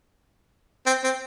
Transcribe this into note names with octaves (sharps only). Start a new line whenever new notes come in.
C4
C4